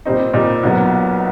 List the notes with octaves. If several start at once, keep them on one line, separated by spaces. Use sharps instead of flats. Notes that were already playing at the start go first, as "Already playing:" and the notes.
A#2 G3 C4 D#4
A#2 G3 C4 D#4
B1 A#2 F#3 B3